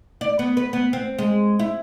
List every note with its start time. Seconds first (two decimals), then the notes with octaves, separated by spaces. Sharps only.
0.21 D5
0.39 B3
0.57 B4
0.73 B3
0.93 C4
1.18 G#3
1.59 E4